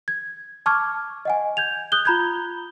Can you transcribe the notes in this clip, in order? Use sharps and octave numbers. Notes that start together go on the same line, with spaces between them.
G#6
A5 C#6 D6 F6 G#6
D#5 F#5 G#5
G6 G#6 F7
D#6 F#6 G6 G7
F4 A#5 B5 G6 G#6